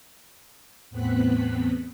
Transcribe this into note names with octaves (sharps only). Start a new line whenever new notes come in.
E2 A2 B3 C4 F#6 B6